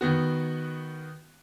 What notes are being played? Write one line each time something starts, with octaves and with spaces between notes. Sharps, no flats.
D#3 B3 F#4